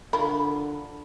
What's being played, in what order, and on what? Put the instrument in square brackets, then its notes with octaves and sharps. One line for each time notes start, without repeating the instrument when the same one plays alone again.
[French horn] D3 [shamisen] F4 A#4 [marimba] B5